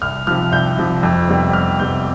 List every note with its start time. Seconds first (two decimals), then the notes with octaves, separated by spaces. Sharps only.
0.02 C2 F6
0.27 C3 F3 F6
0.52 C2 G6
0.78 C3 F3
1.03 F2
1.28 C3 G3 B3
1.53 F2 F6
1.79 C3 G3 B3 G6